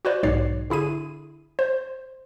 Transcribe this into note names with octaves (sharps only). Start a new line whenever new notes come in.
F#4 B4 C5 D5
B1 G#2 C#5 D5 C7
D3 E4 G#4 D#7
C5